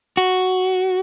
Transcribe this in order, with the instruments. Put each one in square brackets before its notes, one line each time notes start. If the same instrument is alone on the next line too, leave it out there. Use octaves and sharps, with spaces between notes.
[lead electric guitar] F#4